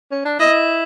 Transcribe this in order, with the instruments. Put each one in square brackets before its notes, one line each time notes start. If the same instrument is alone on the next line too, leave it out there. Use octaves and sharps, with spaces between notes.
[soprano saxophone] C#4
D4
[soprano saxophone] E4 [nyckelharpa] D#5